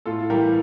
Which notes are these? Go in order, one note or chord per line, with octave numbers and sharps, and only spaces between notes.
A2 F4 A4
E3 G3 G4 A#4